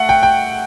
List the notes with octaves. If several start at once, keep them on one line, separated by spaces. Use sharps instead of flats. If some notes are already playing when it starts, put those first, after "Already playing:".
Already playing: A3 F#5
G5
G5